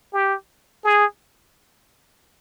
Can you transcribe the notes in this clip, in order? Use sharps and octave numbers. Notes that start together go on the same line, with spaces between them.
G4
G#4